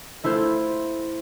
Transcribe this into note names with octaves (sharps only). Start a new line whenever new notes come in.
A3 E4 F4 C5